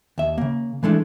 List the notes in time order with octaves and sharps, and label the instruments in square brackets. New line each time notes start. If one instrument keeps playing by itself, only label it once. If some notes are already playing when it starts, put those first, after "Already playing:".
[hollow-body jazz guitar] D#2 E5
C#3 A#3
E3 G#3 A3 D4 E4